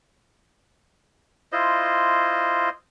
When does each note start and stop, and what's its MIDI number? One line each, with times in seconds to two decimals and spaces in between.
1.52 2.69 64
1.52 2.69 65
1.52 2.69 72
1.52 2.69 75